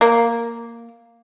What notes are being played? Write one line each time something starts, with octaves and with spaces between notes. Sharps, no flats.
A#3